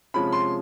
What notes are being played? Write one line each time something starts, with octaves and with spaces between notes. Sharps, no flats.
C3 F3 G#3 C#4 B5
C6